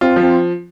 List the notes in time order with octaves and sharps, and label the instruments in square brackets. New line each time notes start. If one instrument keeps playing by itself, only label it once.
[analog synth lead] C4 [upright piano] F4
[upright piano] F3
[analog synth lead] C4